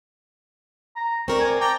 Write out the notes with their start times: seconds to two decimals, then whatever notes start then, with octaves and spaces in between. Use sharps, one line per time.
0.96 A#5
1.28 C4 A#4 D5 C#6
1.40 G#5
1.61 G5 A5 A#5 D6